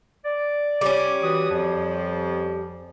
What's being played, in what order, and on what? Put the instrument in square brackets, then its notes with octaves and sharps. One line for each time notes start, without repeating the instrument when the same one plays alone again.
[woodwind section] D5
[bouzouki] G3 C#4
[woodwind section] E3 F#4 D#6
F2 F3